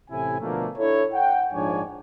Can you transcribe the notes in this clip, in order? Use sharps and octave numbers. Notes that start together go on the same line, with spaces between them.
A1 A2 C3 E4 G#5
B2 D3 F3 A3 A#3
D4 E4 A4 C#5
F#5 G5
A#1 G#2 F3 D4 C#5 G#5